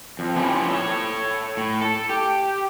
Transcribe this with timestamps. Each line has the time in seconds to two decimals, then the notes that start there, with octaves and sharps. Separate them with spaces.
0.19 F2
0.36 F3 B3 C#4 D4 E4 G4
0.71 A4 C#5
1.57 A2
1.81 A4
2.10 G4